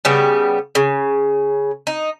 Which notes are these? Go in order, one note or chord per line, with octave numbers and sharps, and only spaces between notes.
C#3 G3 B3
C#3
D#4